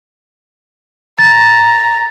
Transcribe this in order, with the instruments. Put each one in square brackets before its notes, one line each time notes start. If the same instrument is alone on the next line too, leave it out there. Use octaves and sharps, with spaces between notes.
[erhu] A#5 [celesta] A6